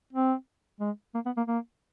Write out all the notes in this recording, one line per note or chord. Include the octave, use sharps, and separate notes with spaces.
C4
G#3
A#3
B3
A#3
A#3